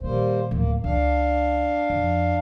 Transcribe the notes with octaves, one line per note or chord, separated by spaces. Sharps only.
A#2 D#3 G3 A#3 C5
D1 C#2 A#3
C#2 D4 F5
F2